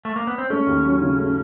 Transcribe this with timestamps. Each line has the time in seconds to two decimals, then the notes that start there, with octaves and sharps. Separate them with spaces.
0.05 A3
0.16 A#3
0.27 B3
0.38 C4
0.50 A3 C#4
0.67 D#2
0.85 F#3
1.02 C#3
1.19 A3